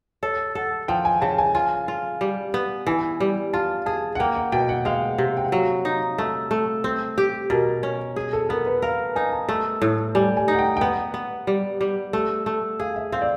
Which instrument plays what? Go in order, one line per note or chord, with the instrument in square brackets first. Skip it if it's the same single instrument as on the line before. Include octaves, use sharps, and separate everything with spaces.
[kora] A4 [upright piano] C#5
[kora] A4 [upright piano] F#5
[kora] F3 [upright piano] G5
[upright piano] G#5
[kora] C#3 [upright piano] A5
[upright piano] G#5
[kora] F4 [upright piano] G#5
[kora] F4
G3
B3
[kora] E3 [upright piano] G#5
[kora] G3
[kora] F4 [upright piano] A5
[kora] G#4 [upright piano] A5
[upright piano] F#5
[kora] A#3 [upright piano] G5
[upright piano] F#5
[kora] B2 [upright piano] G5
[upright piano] F#5
[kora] G#3 [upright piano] F5
[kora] C3
[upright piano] G5
F#5
[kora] F#3 [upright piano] F5
[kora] D#4
[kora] A3 [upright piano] E5
[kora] A3
C4
G4
[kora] B2 [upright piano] A#4
[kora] C#4
G#4
[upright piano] A4
[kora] B3 [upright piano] A#4
[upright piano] B4
[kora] A#4 [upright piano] F5
[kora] D#4 [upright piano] G#5
[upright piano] A5
[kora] A3 [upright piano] A5
[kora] A2
[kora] G3 [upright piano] G#5
[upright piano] G#5
[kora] D#4 [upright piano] F#5
[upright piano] G5
G5
[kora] B3 [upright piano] F#5
[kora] B3
G3
G3
A3
A3
[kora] G#4 [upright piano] F5
[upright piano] E5
[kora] C4 [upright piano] F5
[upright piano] D5